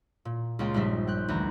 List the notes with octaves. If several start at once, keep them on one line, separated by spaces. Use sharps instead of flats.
A#2
C#2 A#3 F4 G5
A#1 G2 G3 D#4 C5 E5
G5 F#6 G6
D2 E3 D4 A#5